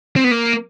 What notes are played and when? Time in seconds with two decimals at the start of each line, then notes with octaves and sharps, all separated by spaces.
0.16 C4
0.24 B3
0.31 A#3